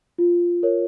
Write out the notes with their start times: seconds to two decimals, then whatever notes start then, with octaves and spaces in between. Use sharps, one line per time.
0.18 F4
0.63 A#4 C#5